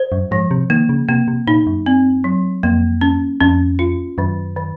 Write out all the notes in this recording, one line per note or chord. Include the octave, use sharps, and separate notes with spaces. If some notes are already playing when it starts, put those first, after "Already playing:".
Already playing: C5
F#2
G#2 F3
C3
D#3 A#3
C#3
C3 A#3
C3
A#2 D#4
F#2
C4
F#3
F2 A#3
C#4
F2 C#4
F4
F#2 D#3
D#3